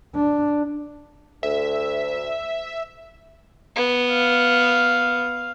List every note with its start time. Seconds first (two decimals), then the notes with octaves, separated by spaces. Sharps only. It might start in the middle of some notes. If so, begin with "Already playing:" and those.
0.15 D4
1.43 D2 E5
3.76 B3
4.12 F5